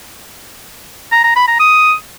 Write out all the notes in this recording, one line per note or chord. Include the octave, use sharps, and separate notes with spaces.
A#5
A#5
B5
A#5
D#6